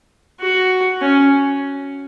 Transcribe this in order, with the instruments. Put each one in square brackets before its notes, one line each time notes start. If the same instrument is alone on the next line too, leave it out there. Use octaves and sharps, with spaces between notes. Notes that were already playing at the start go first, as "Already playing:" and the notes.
[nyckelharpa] F#4
C#4